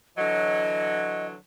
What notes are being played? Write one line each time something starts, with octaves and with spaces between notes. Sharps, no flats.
D3 E3 F#3 D#5